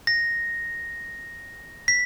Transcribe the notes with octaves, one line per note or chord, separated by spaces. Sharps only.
A#6
B6